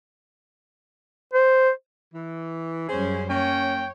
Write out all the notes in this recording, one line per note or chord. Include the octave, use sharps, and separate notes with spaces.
C5
E3
F#2 G3 C#4 G#4 C5
A#3 C#4 C#5 G5